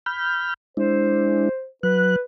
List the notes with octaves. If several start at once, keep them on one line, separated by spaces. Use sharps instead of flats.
B5 F6 G6
G#3 D4 E4 C5
F#3 B4 F#6